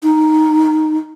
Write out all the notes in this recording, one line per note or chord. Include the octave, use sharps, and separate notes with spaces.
D#4